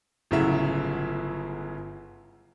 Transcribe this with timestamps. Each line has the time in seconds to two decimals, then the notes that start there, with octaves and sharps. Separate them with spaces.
0.31 G1 A2 C#3 F#3 E5